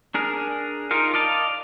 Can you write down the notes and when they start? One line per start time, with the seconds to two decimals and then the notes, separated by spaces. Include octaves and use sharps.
0.14 D4 G#4 A#4
0.91 D#4 F4 A#4 F5
1.14 D5 D#5 F5 A5